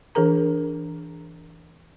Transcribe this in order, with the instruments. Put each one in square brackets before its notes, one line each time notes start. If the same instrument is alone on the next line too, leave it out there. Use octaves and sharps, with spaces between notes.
[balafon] E3 D4 G#4 A#4 A#5